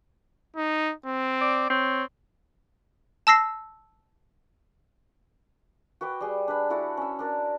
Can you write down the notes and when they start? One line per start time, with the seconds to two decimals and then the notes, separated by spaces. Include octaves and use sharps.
0.57 D#4
1.06 C4
1.41 D5
1.70 C4 C#5
3.27 A5 E6 A#6 C7
6.01 F#4 B4 G5 D6
6.21 G3 G#4
6.48 D4 B4 B5
6.70 E4 F#4 A4 F#5
6.97 C#4 E6
7.19 D4 A#4 D5